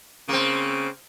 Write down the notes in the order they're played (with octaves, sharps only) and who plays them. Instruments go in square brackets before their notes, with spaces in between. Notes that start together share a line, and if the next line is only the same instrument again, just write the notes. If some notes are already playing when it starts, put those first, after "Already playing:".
[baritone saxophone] C#3 [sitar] A#3 C4